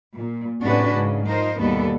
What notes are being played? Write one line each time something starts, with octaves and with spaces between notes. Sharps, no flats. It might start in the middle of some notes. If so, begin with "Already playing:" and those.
A#2
A2 C3 C#4 D4 F#4 B4
G#2 C#3
F3 D#4 A#4 C5
D#2 B2 G3 A#3 B3 A4